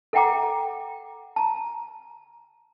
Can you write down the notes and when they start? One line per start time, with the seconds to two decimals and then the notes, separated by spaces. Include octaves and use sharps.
0.13 A4 E5 F#5 G5 A#5 D6
1.36 A5 A#5